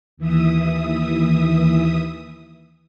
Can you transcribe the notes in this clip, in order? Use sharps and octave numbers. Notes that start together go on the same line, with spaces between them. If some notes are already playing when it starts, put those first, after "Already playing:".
D#2 E3 E5 D#6